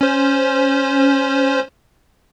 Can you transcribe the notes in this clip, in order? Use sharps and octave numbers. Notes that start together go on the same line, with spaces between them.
C#4 C5